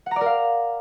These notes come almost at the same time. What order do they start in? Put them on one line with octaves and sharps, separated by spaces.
F#5 A#5 D5 A#4 F5